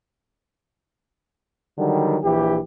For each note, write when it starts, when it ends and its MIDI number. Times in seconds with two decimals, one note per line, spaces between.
1.77 2.18 50
1.77 2.18 51
1.77 2.18 54
1.77 2.18 55
2.24 2.59 34
2.24 2.59 52
2.24 2.59 67